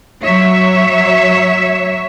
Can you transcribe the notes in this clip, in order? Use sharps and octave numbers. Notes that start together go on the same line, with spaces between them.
F#3 C#5 E5